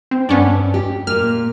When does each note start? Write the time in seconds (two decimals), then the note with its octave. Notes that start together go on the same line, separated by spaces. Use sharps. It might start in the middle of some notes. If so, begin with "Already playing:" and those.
0.11 C4
0.29 G2 B3 C#4 D4
0.74 G4
1.07 A#2 A#3 F6